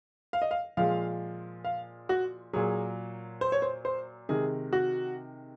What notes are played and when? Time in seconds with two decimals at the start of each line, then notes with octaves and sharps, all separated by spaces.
0.33 F5
0.42 D#5
0.51 F5
0.77 A#2 F3 G#3 F5
1.64 F5
2.09 F#4
2.53 A#2 F#3 G#4
3.41 C5
3.52 C#5
3.62 C5
3.85 C5
4.29 C3 D#3 G#3 G#4
4.73 F#4